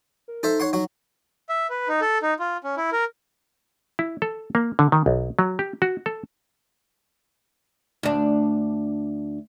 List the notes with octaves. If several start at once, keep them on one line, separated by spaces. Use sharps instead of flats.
A#4
D#4 A4 C5 E5
C#5 F#5 C6
F#3 F#4
E5
B4
D#4
A4
D#4
F4
C#4
E4
A#4
E4
A4
A#3
D3
D#3
B1
F#3
G4
F#4
A4
D2 D4